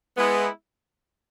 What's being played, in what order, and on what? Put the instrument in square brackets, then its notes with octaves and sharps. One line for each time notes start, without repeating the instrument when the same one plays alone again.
[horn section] G#3 B3 E4